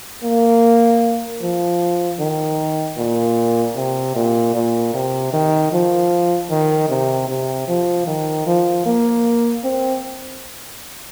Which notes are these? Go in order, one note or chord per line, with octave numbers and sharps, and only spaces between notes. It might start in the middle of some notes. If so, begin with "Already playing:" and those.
A#3
F3
D#3
A#2
C3
A#2
A#2
C3
D#3
F3
D#3
C3
C3
F3
D#3
F3
A#3
C4